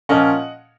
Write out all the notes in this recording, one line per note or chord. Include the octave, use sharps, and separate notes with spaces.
A#2 F3 A#3 C#4 D#5 F#5